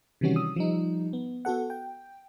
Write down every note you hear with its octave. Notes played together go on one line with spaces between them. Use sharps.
C3 D#3 E3 G3 C#4 F#4
D#6 E6
F3 G3 D#4
B3
B3 F#4 A4 F#5
G5